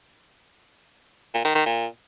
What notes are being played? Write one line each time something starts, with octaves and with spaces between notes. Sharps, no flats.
A#2
D#3
D#3
A#2